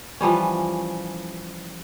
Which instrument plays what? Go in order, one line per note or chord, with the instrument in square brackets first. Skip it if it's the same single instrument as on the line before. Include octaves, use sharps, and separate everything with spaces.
[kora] E3 F3 G3 C#4